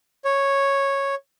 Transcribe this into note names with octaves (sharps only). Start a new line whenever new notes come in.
C#5